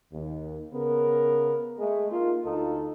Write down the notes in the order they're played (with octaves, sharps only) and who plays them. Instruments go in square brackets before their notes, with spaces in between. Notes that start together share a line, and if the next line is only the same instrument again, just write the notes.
[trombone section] D#2
C#3 B3 A#4
G#3 A3
A#3 D#4 F4
D2 D#4 F4 A4